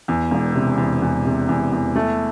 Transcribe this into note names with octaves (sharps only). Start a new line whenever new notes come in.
E2
E1
C3
E2
E2
C3
E2
E2
A3